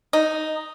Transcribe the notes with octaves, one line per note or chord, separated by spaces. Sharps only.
D#4